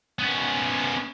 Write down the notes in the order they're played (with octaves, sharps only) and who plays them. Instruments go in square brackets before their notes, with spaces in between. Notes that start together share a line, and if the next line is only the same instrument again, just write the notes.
[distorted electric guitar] B3 C#4